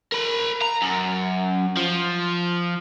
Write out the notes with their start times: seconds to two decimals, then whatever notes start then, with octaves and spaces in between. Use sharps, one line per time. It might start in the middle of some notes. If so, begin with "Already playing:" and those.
0.12 A#4 B5
0.62 A#5
0.82 F#2
1.77 F3